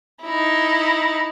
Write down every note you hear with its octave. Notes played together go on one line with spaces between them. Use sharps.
D#4 E4